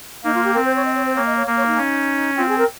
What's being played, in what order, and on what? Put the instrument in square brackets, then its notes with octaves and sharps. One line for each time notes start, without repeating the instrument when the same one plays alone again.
[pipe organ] A#3 [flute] D#4
[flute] F4
G4
[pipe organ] C4 [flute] A#4
[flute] C5
C#5
D#5
C#5
C5
[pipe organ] A#3 [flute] C#5
[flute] D#5
C#5
[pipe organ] A#3
[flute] C#5
D#4
[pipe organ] C#4
[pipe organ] C4 [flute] F4
[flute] G#4
A#4